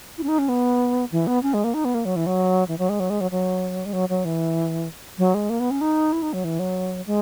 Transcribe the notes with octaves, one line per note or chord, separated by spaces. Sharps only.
E4
C#4
D#4
C#4
B3
E3
B3
C#4
G#3
A#3
D#4
B3
A#3
F#3
E3
F#3
E3
F#3
G#3
F#3
G#3
F#3
F#3
G#3
F#3
F#3
E3
F#3
G#3
A#3
B3
C#4
D#4
E4
D#4
F#3
E3
F#3
G#3